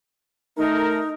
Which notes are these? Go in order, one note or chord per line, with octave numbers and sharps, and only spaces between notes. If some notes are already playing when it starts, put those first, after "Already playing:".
A3 D#4 A#4